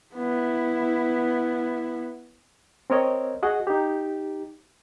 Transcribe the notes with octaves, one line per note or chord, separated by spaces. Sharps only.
B3 E4
C4 A#4 C#5 D#5
F#4 G#4 D#5 F#5
D#4 G4